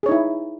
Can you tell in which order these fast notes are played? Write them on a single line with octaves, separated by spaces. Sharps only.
G#4 C#5 D#4 E4